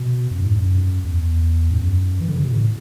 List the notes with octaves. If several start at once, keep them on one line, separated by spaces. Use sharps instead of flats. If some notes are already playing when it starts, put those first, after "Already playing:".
Already playing: B2
F#2
G#2
F#2
E2
G#2
F#2
E3
D3
C#3
B2
A2